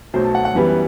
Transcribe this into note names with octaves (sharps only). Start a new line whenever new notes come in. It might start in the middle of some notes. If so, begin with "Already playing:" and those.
B1 B2 F#3 A3 C5
A5
F#5
F#5
F#2 E3 G3 B3